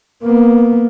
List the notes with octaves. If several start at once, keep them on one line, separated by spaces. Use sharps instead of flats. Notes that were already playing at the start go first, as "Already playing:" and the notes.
A#3 B3